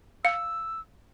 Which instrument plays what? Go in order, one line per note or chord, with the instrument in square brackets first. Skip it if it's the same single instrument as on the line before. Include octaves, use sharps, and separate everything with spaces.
[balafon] F5 [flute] E6